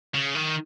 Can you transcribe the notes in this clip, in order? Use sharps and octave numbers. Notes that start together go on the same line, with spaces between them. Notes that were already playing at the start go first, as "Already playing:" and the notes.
C#3
D#3